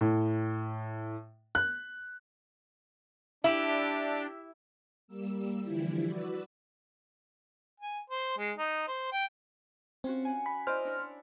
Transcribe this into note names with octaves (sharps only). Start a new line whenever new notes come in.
A2
F#6
D4 E4 G4 E5
G3 A#3 E6
D3 E3 F3 G3 E4
F#4 B4 D5 E6
G#5
C5
G#3
D#4
C5
G5
C4 C#4 F4 F#4
F#5 G#5
B5
E4 C5 D5 D#5 F6
D4 F#4
E4